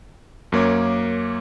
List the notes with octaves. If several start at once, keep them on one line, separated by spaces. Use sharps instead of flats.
F#2 A#3 C#5 D6